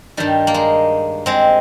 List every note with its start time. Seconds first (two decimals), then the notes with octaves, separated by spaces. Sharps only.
0.17 G2 D#3 G3
0.47 A#3
0.54 G#3
1.26 G#3 C4